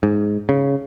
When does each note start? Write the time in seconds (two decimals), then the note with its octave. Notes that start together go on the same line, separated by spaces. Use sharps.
0.03 G#2
0.49 C#3